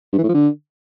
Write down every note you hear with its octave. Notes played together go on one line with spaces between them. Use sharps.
G2
E3
A2
F3
D3